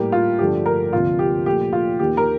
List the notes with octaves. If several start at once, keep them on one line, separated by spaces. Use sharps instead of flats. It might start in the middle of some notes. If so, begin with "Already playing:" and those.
Already playing: A2 G3 A#3 G4
F4
G2 D3 F3 A3 G4
A#4
D2 C3 F3 A#3 F4
G4
A#2 F3 A3 G4
F4
D#2 D#3 A#3 G4
A#4